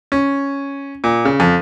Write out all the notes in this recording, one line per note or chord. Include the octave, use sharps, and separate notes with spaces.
C#4
A#2
C#3
F2